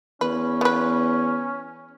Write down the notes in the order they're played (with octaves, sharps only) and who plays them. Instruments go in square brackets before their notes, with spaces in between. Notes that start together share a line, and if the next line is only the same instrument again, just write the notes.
[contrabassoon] E2 [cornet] C#4 [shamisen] B4
[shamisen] B3 B4